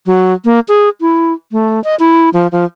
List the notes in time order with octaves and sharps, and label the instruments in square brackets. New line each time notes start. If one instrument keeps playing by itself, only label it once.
[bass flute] F#3
A#3
G#4
E4
A3
D#5
E4
F3
F3